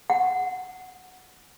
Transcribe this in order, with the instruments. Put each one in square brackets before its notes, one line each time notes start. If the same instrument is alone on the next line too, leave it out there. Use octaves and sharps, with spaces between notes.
[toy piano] F#5